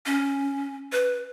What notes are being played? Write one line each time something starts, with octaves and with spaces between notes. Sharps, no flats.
C#4
B4